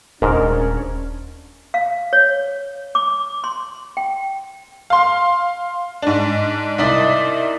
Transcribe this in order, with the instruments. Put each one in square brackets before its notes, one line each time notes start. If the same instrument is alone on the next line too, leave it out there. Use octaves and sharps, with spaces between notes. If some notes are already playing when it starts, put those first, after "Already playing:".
[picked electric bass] D#1 [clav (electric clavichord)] G#2 [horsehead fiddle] C#4 D4 [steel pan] A#4
[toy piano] F5
C#5
D6
C6
G5
[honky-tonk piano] F5 C6
G#2 D4
C2 D#4 D5 D#5 B6